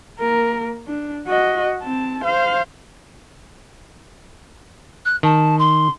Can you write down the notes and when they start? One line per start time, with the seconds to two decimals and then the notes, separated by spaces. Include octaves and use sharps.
0.19 A#3 A#4
0.87 D4
1.27 F#4 D#5
1.82 C4 A5
2.24 C5 F5
5.05 F#6
5.23 D#3 A5
5.58 C6